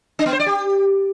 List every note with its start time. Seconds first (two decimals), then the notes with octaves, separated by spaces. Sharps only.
0.19 D4
0.26 B3
0.33 C5
0.40 D5
0.46 G4